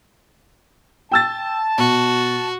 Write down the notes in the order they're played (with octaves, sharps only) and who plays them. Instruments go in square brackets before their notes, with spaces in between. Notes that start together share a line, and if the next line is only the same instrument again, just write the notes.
[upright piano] G5 E6 A6 [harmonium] A5
[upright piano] B2 [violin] F#4